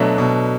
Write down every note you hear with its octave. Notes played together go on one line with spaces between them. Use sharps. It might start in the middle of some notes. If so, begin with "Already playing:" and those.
Already playing: B2 F#3 A3 D4 E5
B2